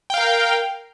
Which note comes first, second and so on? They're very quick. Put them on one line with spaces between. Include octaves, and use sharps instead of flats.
G5 F5 A#4